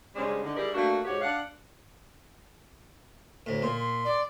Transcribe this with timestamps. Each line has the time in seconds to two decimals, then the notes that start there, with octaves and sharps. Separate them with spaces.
0.16 C#3 G3 G#3 C#4 D4 C5
0.44 D3 D#4
0.56 G3 E4 G4 G#4 A#4 D5
0.74 A3 A#3 D4 F#4
1.05 G#2 F#4 G4 C#5
1.21 D4 D5 F5 F#5
3.46 D2 A2
3.62 A#2 C6
3.79 C6
4.05 D5